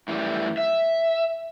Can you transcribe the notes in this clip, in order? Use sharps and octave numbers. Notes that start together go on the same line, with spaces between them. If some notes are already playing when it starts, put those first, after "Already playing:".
F#2 A2 E3 G3
E5